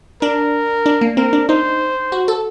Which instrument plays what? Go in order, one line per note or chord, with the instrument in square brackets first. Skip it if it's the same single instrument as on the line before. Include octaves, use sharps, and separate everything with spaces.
[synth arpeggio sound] D4 [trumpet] A#4
[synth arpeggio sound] D4
A#3
[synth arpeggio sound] C4 [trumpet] A#4
[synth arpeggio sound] D4
[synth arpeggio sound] D#4 [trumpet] C5
[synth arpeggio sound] F#4
A4